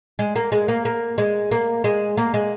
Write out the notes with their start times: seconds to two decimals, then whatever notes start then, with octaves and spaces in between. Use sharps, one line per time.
0.19 G#3
0.36 A#3
0.52 G#3
0.68 A#3
0.85 A#3
1.18 G#3
1.51 A#3
1.84 G#3
2.17 A#3
2.34 G#3